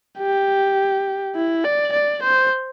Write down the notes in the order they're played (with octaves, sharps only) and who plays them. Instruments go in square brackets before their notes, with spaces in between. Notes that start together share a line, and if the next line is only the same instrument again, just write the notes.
[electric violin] G4
E4
D5
D5
C5